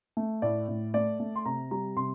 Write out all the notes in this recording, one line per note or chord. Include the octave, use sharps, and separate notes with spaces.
A3
A2 D5
A2
A3 D5
A3
C6
C3 A#5
G3 A#5
C3 C6